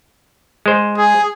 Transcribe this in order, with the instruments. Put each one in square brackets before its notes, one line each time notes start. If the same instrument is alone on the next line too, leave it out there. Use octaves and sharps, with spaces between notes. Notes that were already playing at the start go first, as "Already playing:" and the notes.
[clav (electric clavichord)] G#3 C5
[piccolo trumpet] G#4